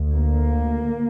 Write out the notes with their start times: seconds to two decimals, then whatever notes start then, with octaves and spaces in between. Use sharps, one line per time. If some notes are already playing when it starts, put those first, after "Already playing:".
Already playing: D2
0.15 A#3